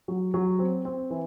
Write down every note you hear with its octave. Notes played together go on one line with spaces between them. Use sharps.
F#3
F#3
C4
C4
E3